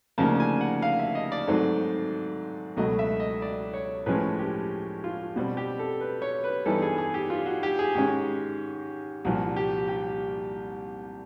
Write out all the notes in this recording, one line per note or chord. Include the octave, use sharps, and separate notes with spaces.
D2 C#3 F3 A#3 D#4 A5
G#5
F#5
F5
E5
D#5
D5
G#2 D#3 F#3 A3 C4
C#2 B2 F#3 A3 D#5
E5
D#5
D5
C#5
A2 F3 G#3 C#4 B4
G4
F4
B2 G3 C4 F#4
G4
A4
B4
C#5
B4
G2 E3 G3 B3 D#4 A4
G#4
G#4
G4
F4
F#4
G4
G#4
G#2 D#3 G#3 C#4 G4
C2 A#2 F3 F#4
G4
G4